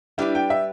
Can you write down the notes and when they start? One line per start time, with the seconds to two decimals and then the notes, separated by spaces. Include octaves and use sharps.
0.18 G3 D4 E4 G4 B4
0.35 G5
0.50 E5